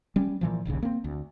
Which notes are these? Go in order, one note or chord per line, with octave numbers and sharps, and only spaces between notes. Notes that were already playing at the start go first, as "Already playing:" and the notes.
G3 C#4
A#2 E3 F3
D#1 A#1 D#2 C#3
A#3 C4
D2